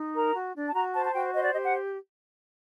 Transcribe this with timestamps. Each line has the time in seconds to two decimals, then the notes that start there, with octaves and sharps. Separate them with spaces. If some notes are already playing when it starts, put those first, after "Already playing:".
Already playing: D#4
0.13 A#4 A#5
0.34 F#4
0.54 D4
0.67 A5
0.74 F#4 A#5
0.94 C5 A5
1.04 A5
1.14 F#4 G5
1.33 C5 D#5
1.42 D5
1.52 G4 D#5
1.63 F#5